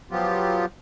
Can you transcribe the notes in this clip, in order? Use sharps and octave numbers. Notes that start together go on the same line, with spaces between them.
F3 F#3 B3 F4 G4